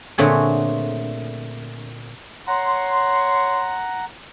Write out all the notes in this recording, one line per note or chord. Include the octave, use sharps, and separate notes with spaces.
A#2 D3 A3 C4 G#4 C#5
C#5 F#5 A#5 C6